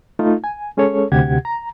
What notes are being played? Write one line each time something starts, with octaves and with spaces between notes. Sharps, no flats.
A3 D#4 F4
G#5
G#3 C#4 G#4 A4 C#5
D2 C3 G4 F#5 G#6
A#5